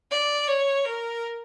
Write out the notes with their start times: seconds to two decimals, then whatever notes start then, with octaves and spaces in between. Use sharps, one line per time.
0.11 D5
0.48 C#5
0.85 A#4